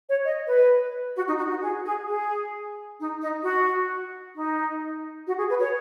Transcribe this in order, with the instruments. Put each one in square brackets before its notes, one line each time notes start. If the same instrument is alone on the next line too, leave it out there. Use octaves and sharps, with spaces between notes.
[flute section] C#5
D#5
B4
F#4
D#4
F#4
F#4
G#4
G#4
G#4
D#4
D#4
F#4
D#4
F#4
G#4
B4
C#5